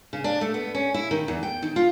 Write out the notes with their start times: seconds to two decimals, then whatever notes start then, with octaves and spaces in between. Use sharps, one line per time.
0.13 C#3
0.24 D4
0.41 A3
0.54 B3
0.75 C#4
0.94 E4
1.11 D#3
1.28 E2
1.43 G5
1.62 D#3
1.76 F4